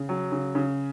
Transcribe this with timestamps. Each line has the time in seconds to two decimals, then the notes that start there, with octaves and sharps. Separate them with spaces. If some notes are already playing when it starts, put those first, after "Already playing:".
Already playing: C#3
0.09 F#3
0.32 C#3
0.55 C#3